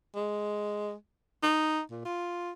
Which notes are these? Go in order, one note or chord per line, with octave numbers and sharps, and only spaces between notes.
G#3
D#4
A#2
F4